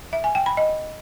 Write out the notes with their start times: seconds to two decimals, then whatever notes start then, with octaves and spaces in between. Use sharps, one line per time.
0.13 E5
0.24 G#5
0.35 G5
0.46 B5
0.57 D#5